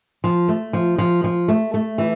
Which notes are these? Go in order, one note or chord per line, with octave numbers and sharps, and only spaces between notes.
F3
A3
F3
F3
F3
A3
A3
E3